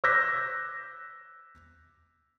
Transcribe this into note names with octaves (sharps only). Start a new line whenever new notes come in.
D6 E6 F#6 G6 A#6 B6